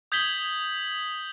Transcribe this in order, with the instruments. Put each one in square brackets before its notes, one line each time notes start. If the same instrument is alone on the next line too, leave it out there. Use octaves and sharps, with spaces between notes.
[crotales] D#6 G6 G#6 B6 F#7 G7